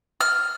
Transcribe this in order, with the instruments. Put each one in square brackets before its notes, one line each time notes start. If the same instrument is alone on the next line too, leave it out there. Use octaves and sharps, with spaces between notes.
[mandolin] F6